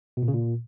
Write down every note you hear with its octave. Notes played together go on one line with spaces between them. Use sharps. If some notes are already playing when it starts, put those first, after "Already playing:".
B2
A#2
C#3
A#2